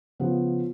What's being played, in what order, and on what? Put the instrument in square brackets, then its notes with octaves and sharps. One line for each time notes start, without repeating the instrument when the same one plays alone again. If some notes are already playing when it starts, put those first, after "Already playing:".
[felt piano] C#3 F3 B3